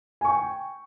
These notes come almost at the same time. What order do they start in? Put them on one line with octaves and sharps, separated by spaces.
G#5 C#6 G5